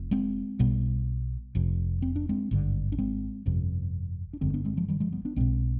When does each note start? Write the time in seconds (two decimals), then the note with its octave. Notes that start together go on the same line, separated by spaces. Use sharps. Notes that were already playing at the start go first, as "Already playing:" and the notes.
Already playing: F1 F2
0.11 G#3 C4
0.59 B1 B2 G3 B3
1.55 F1 F2 C3
2.02 C4
2.16 D4
2.29 G#3 C4
2.51 G#1 G2 D3
2.92 D4
2.98 G#3 C4
3.46 G1 F2 C3
4.33 D4
4.41 G1 F2 D3 G#3 C4
4.54 B3 D4
4.65 G#3 C4
4.77 F3 G#3
4.88 D#3 G3
5.00 F3 G#3
5.12 G3 B3
5.25 B3 D4
5.36 B1 B2 G#3 C4